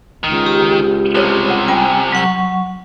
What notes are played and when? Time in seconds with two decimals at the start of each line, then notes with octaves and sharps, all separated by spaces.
0.23 C#2 D#3
0.46 G4
1.15 C2 C3 A4 C5 C#5
1.47 C#5 F#5
1.68 G3 C#4 F4 G5 G#5
2.12 F#3 F#5 C#6